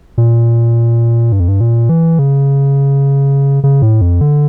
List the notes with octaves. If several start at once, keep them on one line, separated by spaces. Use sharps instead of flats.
A#2
G2
F2
G2
A#2
E3
C#3
C#3
A2
F2
D3